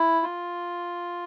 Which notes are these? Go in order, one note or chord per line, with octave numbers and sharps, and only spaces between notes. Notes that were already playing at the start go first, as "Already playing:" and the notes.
Already playing: E4
F4